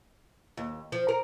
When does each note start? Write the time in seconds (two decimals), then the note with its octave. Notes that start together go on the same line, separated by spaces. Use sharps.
0.57 D#2
0.92 F3
1.09 A#4